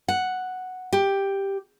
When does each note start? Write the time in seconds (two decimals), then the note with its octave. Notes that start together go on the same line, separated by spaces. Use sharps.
0.08 F#5
0.93 G4